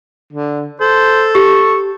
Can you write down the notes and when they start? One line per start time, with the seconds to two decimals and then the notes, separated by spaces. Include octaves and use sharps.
0.33 D3
0.81 A4 C5
1.35 G4 C#6